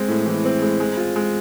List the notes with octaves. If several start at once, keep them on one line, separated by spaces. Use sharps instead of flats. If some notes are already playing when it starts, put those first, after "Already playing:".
Already playing: G#3 C4
A2
E3
C4
G#3
G#3
F4
G#3